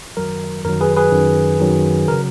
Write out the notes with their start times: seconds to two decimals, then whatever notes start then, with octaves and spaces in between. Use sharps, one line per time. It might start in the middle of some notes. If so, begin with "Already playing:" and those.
0.17 F#2 D#3 F#3 A#4
0.64 F#2 D#3 F#3 A#4
0.81 G#4 B4
0.97 G#4 B4
1.12 F#2 D#3 F#3
1.60 F#2 D#3 F#3
2.08 C#3 F#3 A#4